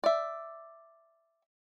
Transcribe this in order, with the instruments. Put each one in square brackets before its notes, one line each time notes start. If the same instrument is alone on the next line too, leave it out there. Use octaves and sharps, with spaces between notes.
[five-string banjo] D5 E5